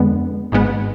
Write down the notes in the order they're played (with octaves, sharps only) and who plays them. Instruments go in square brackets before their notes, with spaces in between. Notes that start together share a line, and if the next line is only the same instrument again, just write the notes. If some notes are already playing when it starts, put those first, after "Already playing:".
Already playing: [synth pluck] F2 D3 G#3 B3
G#1 G#2 G#3 B3